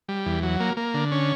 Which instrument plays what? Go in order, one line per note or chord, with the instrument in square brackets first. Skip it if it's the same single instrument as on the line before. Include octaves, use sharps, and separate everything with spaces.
[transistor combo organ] G3
E2
F#3
A#3
A#3
D3
C#4